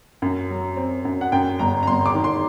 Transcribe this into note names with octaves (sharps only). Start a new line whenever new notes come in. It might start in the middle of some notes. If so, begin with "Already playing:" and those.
F#2
F#3
C4
F#2
F#5
F#2 G5
G1 A#5
A#5
G1 C6
D6
D#3
C6